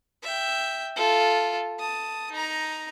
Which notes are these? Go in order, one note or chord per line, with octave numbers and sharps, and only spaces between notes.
E5 G5
F4 A4
A5 D#6
D#4 A#5